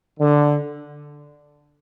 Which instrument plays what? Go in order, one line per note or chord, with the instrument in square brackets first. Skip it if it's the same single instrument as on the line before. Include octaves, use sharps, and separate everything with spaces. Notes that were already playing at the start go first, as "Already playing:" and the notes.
[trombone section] D3